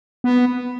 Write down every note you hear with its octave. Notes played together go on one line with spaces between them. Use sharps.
B3